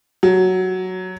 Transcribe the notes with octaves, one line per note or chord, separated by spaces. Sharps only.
F#3